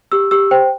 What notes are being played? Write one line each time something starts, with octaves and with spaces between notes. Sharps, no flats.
G4 E6
G4 E6
C5 G5